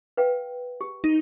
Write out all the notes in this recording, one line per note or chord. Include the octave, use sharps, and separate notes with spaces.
B4 F5 G5
G4
D#4